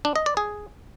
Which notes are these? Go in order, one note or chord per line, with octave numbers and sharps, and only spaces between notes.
D4
D#5
D5
G#4